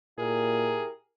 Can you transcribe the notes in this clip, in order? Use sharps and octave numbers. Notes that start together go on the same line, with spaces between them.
A#2 E4 G4 G#4 A#4